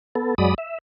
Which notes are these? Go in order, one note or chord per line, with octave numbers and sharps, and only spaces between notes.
B3 A4
F#2 F#3 G#3 D5 B5 D#6
E5